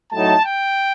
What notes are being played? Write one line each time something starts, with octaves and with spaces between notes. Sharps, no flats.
A2 F#3 A3 D#4 A5
G5